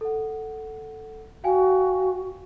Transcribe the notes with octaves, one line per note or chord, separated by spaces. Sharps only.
A4 F#5
F#4 F5 G5 G#5